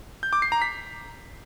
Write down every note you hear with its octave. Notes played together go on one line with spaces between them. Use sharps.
G6
D6
C7
A#5
B6